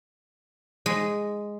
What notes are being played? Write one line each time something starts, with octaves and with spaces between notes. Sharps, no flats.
G#3